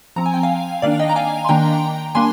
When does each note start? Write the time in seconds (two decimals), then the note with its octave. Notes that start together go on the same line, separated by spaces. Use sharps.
0.16 F3 C4 A#5
0.26 G#5
0.34 G5
0.43 F5 G#5
0.82 D#3 A#3 D4 D5 F5
0.99 D#5 G5
1.09 A#5
1.16 F5 G#5
1.45 C6
1.49 D#3 A#3 D4 G5 A#5
2.15 G3 A#3 D4 G#5 C6